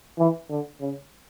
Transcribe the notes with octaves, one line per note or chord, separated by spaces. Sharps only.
E3
D3
C#3